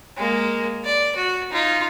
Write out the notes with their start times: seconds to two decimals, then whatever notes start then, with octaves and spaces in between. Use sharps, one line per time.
0.17 G#3 A#3
0.85 D5
1.16 F#4
1.52 D#4 F4